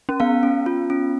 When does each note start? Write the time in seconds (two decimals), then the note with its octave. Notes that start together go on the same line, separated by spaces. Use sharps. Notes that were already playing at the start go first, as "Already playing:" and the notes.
0.09 C#4
0.20 B3 F5
0.43 C#4
0.66 F4
0.90 C#4